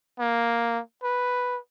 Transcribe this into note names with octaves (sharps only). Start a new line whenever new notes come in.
A#3
B4